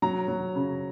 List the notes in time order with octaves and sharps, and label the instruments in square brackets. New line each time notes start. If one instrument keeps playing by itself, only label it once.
[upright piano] F#3 A#5
F#3
C#3